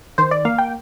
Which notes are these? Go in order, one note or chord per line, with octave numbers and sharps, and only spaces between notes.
D#3 C5
D5
A#3 F5
G5